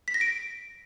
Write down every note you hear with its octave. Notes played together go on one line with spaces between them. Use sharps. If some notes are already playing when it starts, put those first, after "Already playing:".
B6
A#6
D7